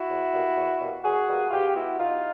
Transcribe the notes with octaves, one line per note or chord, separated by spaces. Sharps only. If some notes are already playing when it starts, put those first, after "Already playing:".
Already playing: E4 F#4
E2
B2 G3 A#3
E2
B2 G3 A#3
E2 F#4 G#4
B2 G3 A#3
B2 F4 G4
G#3 B3 E4 F#4
B2 D#4 F4